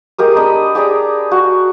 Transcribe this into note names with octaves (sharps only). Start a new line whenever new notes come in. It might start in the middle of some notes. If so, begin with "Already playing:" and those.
G#3 G4 A#4 D#6
D4 D#5 B5
G4 G#4 D5 A#5
F#4